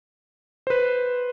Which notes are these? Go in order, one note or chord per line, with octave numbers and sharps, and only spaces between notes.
B4 C5